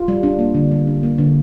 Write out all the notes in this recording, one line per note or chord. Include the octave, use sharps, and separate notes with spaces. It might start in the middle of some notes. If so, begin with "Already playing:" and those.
Already playing: F4
G3
D4
A#3
D3
G3
D4
A#3
D3